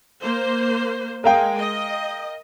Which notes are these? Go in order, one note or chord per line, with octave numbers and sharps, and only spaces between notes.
A#3 C5
G#3 A#4 F5 G5
D#5